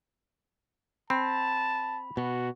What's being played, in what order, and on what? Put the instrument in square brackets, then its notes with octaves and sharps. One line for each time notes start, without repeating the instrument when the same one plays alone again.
[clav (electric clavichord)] C4 [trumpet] A5 [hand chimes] B5
[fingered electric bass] B2 [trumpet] F#4